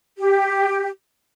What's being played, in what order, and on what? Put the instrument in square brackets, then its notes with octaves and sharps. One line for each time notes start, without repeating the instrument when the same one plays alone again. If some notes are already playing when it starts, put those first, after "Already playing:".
[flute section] G4